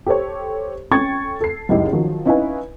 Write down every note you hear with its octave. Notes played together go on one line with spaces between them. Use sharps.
G4 A4 C5 C#5
C#4 A4 G5 C#6 G#6 A6
A4 C7
F#1 C#2 D#4 E4 G4
D#3 F3 F#3
C#4 D#4 E4 B4 F5 G#5